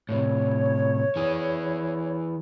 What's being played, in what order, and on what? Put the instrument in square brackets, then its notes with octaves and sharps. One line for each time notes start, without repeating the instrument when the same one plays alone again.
[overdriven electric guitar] A2 C3 [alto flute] C#5
[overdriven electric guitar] E3 G#4